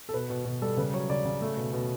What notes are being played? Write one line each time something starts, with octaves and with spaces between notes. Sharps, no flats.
A4
B2 B4
B2
B2
G3 A4
C#3 B4
F#3 C#5
C#3 D5
C#3
A3
B2
B2